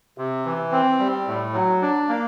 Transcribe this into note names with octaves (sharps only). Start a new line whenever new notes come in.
C3
E3
C4
G3
A2
F#3
D4
A#3